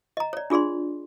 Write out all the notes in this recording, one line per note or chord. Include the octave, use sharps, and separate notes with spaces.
D#5 A#5
C#5 D5
D4 F4 G#4 D5 C6